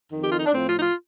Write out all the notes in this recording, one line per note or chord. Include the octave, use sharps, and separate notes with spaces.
F2 D#3
G4
F4
D#4
D4
A2 F3 C4
F4
D#4
F4